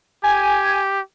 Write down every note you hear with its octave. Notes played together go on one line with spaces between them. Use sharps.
G4 G#5